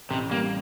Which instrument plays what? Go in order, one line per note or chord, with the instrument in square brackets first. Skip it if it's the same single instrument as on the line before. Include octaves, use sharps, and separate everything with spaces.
[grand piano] A1 [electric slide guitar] C3
[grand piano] G3 [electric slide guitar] A#3